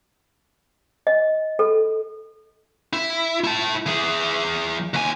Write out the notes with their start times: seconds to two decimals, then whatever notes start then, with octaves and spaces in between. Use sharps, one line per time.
1.07 D#5
1.59 A4
2.93 E4
3.44 E4 A5
3.86 E3 G#4
4.94 D#2 G#5